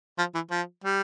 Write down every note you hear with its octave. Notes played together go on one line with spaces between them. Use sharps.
F3
E3
F3
G3